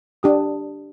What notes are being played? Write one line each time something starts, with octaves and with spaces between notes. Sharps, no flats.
D4 G4 D#6